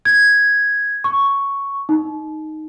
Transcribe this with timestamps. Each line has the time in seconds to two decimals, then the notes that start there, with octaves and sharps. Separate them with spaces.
0.05 G#6
1.04 C#6
1.89 D#4